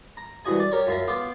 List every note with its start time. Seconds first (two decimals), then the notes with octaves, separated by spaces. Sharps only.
0.17 A#5
0.45 C2 E3 F#4 D#5 G#5
0.60 D5
0.72 G4 A#4 C#5
0.87 F#2 F4 E5 A#5
1.08 B3 F4 G5 D6